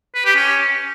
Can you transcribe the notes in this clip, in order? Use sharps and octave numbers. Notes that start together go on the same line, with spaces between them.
B4
G4
C#4